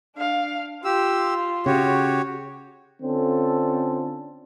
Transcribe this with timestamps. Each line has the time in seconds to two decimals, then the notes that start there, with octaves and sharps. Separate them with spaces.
0.16 D4 F5
0.85 F4 G4 E6
1.66 C#3 F#4 G4 C#5
3.02 D3 C4 C#4 F4 A4